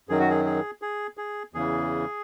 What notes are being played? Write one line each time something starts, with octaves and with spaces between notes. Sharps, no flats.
F#2 D#3 F#3 G#4
F#4
G#4
G#4
G#4
G#4
E2 C#3 E3 G#4